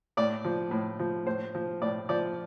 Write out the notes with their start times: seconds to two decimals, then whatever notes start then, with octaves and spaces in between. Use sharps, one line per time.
0.17 A2 D5
0.45 F3
0.71 A2
0.99 F3
1.26 A2 C5
1.55 F3
1.82 A2 D5
2.09 F3 D5